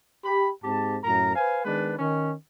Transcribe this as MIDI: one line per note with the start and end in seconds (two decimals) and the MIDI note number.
0.25 0.49 67
0.25 0.49 83
0.64 0.98 44
0.64 0.98 60
0.64 0.98 67
0.64 0.98 81
1.04 1.34 42
1.04 1.34 45
1.04 1.34 70
1.04 1.34 82
1.35 1.62 71
1.35 1.62 72
1.35 1.62 77
1.35 1.62 80
1.65 1.95 51
1.65 1.95 56
1.65 1.95 59
1.65 1.95 62
1.65 1.95 71
1.99 2.32 51
1.99 2.32 61